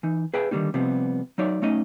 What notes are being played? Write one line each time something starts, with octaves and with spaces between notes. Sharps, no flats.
E3 D#4
G#4 B4 E5 G5
D3 D#3 F3 G3 A#3 D#4
C3 F3 G3 B3 C4
F#3 D#4 C#5 D5 E5
F#2 A3 C#4 D#4 D#5